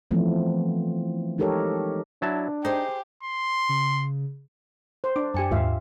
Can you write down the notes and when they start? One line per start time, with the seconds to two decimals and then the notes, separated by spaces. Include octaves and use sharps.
0.11 E3 F3 A3 B3 C4
1.38 G#3 D#4 G4 A4 A#4 C#5
2.22 F#3 D4 E4 A5
2.65 D#4 G4 G#4 C5
3.23 C6
3.69 C#3
5.04 C5
5.16 D4 D6
5.34 F#2 G4 G#5 A5 C#7
5.51 D#2 G#2 F4 E5 F5